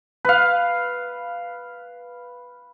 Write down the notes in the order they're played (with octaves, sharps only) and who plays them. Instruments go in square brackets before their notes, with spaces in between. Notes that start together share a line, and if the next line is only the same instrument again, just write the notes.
[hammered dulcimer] B4 F5